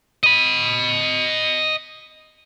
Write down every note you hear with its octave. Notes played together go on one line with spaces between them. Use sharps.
D#5 B5 D#7